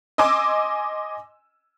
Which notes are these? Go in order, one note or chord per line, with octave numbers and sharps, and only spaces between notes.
D#5 G#5 C6 D6 E6